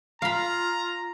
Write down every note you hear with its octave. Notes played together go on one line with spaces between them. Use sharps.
F4 F5 A#5 B5